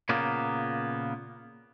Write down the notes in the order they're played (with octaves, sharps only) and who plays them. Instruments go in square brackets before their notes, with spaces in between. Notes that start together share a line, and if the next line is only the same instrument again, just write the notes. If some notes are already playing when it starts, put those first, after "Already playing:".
[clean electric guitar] A#2 C#3 A#3 B3